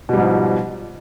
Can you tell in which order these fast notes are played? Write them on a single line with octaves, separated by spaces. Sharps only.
B2 G3 G#2 F3